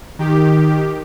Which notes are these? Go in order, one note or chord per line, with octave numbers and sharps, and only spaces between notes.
D#3 G4